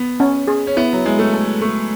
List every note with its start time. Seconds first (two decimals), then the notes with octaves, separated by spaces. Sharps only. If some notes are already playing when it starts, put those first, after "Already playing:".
Already playing: B3
0.20 C#4
0.48 G#4
0.67 C#4
0.77 B3 E4
0.93 F#3
1.06 G#3 E4
1.19 A3
1.34 A4
1.61 A3 C#6